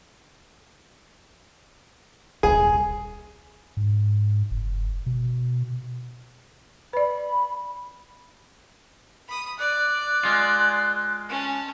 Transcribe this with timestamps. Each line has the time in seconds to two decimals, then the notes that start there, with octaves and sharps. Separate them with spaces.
2.43 D#1 C2 G#4 G#5
3.77 G#2
4.51 F#1
5.06 B2
6.93 B4 D5 B5
9.28 B5 D#6
9.59 D5 F#6
10.23 G#3 F4
11.29 C#4 A5